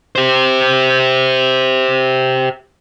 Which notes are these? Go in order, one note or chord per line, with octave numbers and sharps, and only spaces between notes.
G4 C5